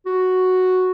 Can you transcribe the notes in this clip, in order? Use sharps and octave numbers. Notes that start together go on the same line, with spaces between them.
F#4